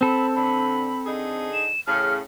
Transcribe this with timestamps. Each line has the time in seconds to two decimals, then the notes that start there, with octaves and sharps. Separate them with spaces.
0.01 C4 A4 B5
0.35 D3 B5
1.06 D3 D#4 G#4
1.53 E7
1.87 A2 C#3 F6